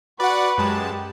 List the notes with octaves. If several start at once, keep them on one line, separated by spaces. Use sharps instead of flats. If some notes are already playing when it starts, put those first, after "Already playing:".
F#4 B4 D5 F#5
F#2 G#3 G4 A5